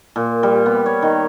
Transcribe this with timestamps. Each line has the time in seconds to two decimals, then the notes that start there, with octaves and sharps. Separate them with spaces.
0.16 A#2
0.43 G3
0.66 B3
0.86 C#5
1.02 D#3